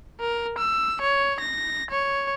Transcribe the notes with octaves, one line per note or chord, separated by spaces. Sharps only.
A#4
E6
C#5
A#6
C#5